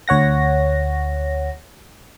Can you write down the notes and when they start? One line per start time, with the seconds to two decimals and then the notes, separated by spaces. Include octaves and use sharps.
0.08 D2 C#5 F#5 A#6